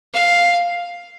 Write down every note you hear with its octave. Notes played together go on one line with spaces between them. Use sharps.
F5